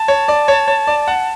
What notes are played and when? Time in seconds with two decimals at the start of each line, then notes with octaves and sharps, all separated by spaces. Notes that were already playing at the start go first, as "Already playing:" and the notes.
Already playing: A5
0.08 C#5
0.28 D5
0.48 C#5
0.68 C#5
0.87 D5
1.08 F#5